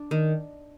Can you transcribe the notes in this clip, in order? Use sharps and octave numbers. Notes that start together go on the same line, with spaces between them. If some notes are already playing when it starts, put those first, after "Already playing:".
Already playing: D4
D#3